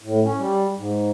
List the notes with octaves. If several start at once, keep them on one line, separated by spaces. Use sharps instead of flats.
A2
C#4
G3
G#2